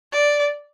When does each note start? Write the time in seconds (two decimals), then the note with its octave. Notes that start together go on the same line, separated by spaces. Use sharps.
0.13 D5